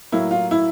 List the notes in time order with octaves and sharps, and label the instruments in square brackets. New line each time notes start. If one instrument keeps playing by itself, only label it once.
[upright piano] A2 F#3 A#3 E4
F4
E4